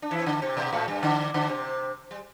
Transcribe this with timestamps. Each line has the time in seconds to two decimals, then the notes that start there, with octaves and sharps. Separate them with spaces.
0.02 D4
0.11 E3 E4
0.19 C4
0.26 D3 D4
0.42 C3 C4
0.57 B2 B3
0.73 A2 A3
0.88 G2 G3
1.03 D3 D4
1.34 D3 D4
1.49 C3 C4
2.11 G3